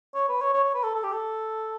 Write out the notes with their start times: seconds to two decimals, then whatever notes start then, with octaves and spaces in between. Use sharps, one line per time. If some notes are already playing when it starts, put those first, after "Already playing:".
0.15 C#5
0.29 B4
0.42 C#5
0.54 C#5
0.64 C#5
0.74 B4
0.84 A4
0.95 A4
1.04 G4
1.13 A4